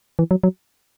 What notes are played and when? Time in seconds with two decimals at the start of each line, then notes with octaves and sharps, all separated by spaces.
0.19 E3
0.31 F#3
0.43 F#3